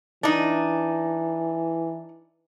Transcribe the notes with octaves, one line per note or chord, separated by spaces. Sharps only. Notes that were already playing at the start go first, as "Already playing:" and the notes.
E3 D4 D#4